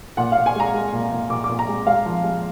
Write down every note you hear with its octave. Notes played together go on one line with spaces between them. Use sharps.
A#2 F#5
A#2 F5
G#5
G#3 A#5
G#3
A#2
A#2
A#2 D6
D6
A#2
A#5
G#3
G#3 F5
F3
G#3